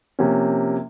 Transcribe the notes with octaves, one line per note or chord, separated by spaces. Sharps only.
C3 F3 A#3 C#4